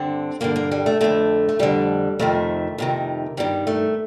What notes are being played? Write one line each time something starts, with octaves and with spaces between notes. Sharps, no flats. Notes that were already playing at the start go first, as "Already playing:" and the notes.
Already playing: G2 D3 C4
G2 D3 A#3
A#3
G3
A3
F2 D3 A3
A3
F2 D3 G3
F2 C3 D#3 A3
F2 C3 D#3
G2 D#3 G3
A3